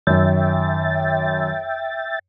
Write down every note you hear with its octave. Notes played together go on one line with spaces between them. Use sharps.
F#2 D#3 F#3 E5 G5 A6